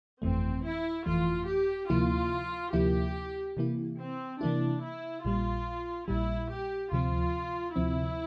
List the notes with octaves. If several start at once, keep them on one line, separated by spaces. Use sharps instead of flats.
G1 F2 E3 A3 C4
E4
G1 F2 E3 A3 F4
G4
D2 C3 F3 A#3 E4 F4
D2 C3 F3 A#3 E4 G4
C3 E3 A#3 E4
C4
C3 E3 A#3 D4 E4
E4
A#1 A#2 G3 F4
A#1 A#2 G3 E4
G4
D2 C3 F3 C4 F4
D2 C3 F3 C4 E4